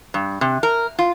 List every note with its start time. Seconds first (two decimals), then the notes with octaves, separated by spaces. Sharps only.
0.14 G2
0.41 C3
0.63 A#4
0.99 F4